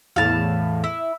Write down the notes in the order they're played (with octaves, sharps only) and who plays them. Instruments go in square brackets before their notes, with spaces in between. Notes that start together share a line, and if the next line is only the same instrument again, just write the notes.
[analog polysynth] E2 A2 [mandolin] F5 A5
[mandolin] E4